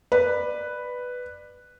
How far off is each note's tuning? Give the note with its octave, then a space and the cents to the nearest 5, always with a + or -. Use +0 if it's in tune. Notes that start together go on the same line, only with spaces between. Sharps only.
B4 +0 D5 +20